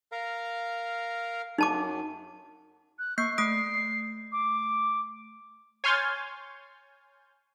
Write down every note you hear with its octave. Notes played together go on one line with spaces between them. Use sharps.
A#4 F5 A#5
F#2 D#4 A5 D6
F#6
A#3 C#6 G6 C7
A3 D#6 C7 D7
D6
C#5 G#5 C6 F6 G6 A6